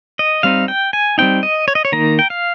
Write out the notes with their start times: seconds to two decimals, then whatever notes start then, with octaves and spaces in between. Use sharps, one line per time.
0.19 D#5
0.43 G3 C4 D#4 F5
0.68 G5
0.93 G#5
1.18 G3 C4 D#4 G5
1.43 D#5
1.68 C#5
1.75 D#5
1.85 C#5
1.92 D#3 A#3 D#4 A#5
2.19 G5
2.30 F5